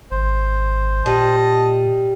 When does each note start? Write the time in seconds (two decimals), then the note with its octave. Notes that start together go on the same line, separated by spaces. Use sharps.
0.11 G#1 C5
1.06 A#2 G3 D#5 A5